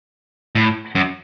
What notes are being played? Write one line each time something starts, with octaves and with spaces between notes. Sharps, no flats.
A2
F#2